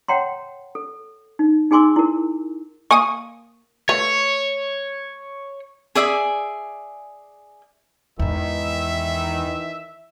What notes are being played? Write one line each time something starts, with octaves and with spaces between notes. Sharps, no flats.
C#5 F#5 G5 A#5 C6
A4
D#4
D#4 G#4 G#5 C6 D6 E6
E4 A#4
A#3 G#5 C#6 D#6
A3 B4 C#5
G#4 D5 E5 G#5
E2 G#2 D#3 E3 E5